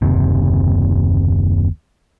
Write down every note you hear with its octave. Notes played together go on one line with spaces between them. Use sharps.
F#1 D#2 C3